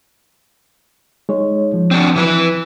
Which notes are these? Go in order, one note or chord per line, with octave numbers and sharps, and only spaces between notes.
G#3 D#4 C#5
F3
C4 D4 F#4
E3 B4